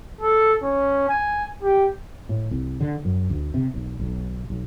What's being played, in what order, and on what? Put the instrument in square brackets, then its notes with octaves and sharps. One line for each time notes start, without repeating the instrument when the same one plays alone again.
[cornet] A4
C#4
G#5
G4
[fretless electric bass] A2
C2
D3
F#2
D2
C3
B1
B1
B1